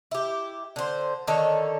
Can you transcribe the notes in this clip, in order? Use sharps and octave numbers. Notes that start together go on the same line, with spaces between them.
E4 G4
D3 C5
D3 D#3 A4 C#5